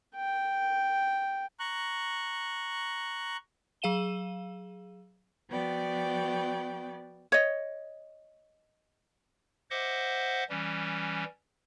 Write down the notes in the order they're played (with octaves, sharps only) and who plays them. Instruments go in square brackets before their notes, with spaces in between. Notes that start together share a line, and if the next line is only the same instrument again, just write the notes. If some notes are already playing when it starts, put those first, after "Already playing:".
[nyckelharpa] G5
[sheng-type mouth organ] A#5 C#6 F#6
[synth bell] F#3 G#4 F5 D#7 E7 G7
[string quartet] F3 B3 F#4 D5 G5
[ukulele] C#5 D#5
[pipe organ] C5 D#5 E5 F#5 D6
E3 G3 C#4